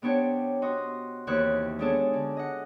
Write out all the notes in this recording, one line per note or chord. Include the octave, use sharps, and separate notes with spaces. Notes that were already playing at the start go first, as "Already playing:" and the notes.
C3 B3 D4 C#5 G5
F#4 D#5 C6
D#2 C3 D#3 E3 C#5 F#6
G#3 B3 D4 G#4 A4 C#5
D3
D#5 F#5